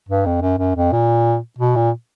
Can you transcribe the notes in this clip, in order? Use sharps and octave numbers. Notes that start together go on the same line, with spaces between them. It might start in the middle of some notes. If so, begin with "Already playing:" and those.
G2
F2
F#2
F#2
F2
A#2
B2
A#2